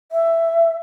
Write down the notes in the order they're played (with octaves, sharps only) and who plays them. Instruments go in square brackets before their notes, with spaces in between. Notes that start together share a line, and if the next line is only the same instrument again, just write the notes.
[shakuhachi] E5